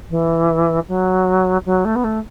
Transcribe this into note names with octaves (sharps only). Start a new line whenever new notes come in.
E3
F#3
F#3
A3
B3
A3